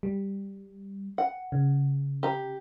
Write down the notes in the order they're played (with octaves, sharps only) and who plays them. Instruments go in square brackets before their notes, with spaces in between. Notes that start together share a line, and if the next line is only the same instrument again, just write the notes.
[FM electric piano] G3
[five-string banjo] F#5
[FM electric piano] C#3
[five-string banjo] G4 A#5